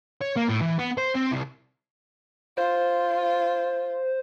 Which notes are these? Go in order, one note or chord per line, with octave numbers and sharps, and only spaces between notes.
C#5
A#3
A2
E3
B3
C5
C4
C2
F4 C5